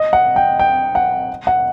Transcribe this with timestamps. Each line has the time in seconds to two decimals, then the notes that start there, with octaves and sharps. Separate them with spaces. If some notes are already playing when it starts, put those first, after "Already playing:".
Already playing: D#5
0.13 F#5
0.36 G5
0.60 G5
0.95 F#5
1.47 F#5